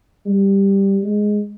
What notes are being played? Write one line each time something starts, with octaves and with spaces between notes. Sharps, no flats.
G3
G#3